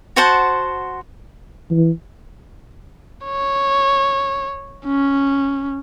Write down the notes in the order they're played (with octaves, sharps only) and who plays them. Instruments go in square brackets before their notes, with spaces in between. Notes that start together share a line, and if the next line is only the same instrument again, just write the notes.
[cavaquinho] F#4 C5 F#5 A5
[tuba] E3
[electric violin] C#5
C#4